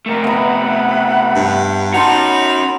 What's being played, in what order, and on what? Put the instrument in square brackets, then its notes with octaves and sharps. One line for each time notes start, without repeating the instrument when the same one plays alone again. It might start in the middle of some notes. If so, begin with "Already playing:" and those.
[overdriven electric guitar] C3 A3 [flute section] A#4
[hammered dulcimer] B3 A#5 [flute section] E5 F#5 B5
[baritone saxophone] G2
[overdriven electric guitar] C#4 F#4 [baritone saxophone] D#4 [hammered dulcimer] F#5 A5 C6 [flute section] B5